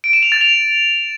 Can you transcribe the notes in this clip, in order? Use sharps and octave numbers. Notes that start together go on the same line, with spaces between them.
D7
E7
F7
A6
F7